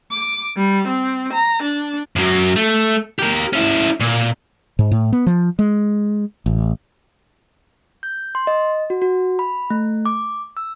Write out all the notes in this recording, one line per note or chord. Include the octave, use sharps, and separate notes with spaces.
D6
G3
C4
A#5
D4
F#2 F#3
A3
G4 A#4
C#4 E4
A#2
G#2
A2
B3
F3
G#3
A1
G6
C6
D#5
F#4
F#4
B5
A3
D6
E6